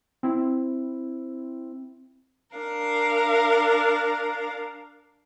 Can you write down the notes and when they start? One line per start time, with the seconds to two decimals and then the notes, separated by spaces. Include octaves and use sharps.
0.23 C4 E4
2.56 D4 A#4 F5